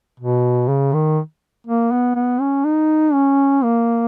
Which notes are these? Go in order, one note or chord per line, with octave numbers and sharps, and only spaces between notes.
B2
C#3
D#3
A#3
B3
B3
C#4
D#4
C#4
A#3